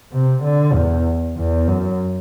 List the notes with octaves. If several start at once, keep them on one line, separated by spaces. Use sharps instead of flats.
C3
D3
E2
E2
F#2